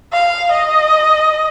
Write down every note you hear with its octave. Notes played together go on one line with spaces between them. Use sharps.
F5
D#5